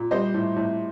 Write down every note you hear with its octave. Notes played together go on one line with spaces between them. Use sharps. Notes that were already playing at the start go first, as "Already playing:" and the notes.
Already playing: A#2
G3 C5 D#5
A2
A2